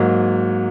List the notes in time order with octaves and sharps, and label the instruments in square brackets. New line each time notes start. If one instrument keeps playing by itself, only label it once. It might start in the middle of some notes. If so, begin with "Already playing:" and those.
Already playing: [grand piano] G#2 F#3 A#3